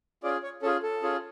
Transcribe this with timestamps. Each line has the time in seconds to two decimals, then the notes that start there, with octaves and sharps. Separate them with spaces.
0.23 C#4 F4 G#4 D5
0.43 C#5
0.62 C#4 A4
0.65 F4 G#4
0.83 A4
1.02 C#4 F4 G#4